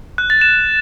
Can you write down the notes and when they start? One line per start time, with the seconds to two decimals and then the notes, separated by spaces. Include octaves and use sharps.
0.18 F#6
0.30 A6
0.41 E7